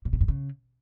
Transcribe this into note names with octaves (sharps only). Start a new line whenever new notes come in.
A#2
C3
G2
C#3